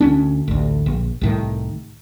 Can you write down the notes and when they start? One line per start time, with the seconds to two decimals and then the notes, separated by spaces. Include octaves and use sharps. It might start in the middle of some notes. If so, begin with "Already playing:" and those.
0.01 D2 C#4 D4
0.48 A1 D2
0.86 A#1
1.21 C2 A2 D#3